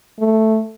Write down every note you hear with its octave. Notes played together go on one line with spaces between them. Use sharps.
A3